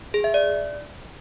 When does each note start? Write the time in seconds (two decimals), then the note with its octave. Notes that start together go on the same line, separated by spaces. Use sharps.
0.14 G#4
0.24 E5
0.34 D5